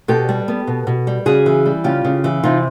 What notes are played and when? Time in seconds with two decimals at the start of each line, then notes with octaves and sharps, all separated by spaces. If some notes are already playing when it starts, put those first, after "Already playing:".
0.08 B2 G4 A4
0.29 G3
0.48 B3
0.67 B2
0.87 B2
1.07 G3
1.26 C#3 F#4 G#4
1.46 E3
1.66 G3
1.84 C#3 F4 G4
2.05 C#3
2.24 E3
2.43 C3 D#4 F4